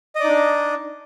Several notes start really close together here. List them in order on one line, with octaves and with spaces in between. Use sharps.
D#5 D5 D#4 D4